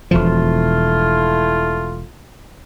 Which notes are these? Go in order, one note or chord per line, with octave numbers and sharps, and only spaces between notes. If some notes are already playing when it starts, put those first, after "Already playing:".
E1 B2 F3 A3 E4 F4